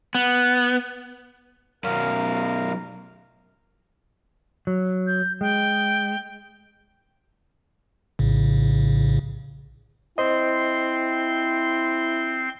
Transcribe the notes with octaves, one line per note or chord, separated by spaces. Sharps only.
B3
F#2 B2 A#4 F5
F#3
G6
G#3 G5
A#1 A2 C#3
C4 E4 C5 D#5 C6